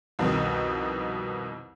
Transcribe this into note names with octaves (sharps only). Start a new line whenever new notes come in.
C2 F2 B2 D#3